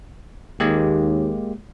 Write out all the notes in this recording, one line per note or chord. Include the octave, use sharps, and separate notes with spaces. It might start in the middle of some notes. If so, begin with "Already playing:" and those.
D#2 G#3 A#3 G4